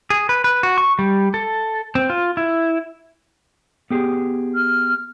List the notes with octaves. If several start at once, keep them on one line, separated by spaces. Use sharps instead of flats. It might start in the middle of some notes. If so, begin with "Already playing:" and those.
G#4
B4
B4
F#4
C#6
G3
A4
C4
F4
E4
B3 G4 G#4
F6